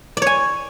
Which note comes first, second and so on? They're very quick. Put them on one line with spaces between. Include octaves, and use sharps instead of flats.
D5 C#5 G#5